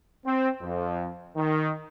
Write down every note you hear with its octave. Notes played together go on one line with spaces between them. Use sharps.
C4
F2
D#3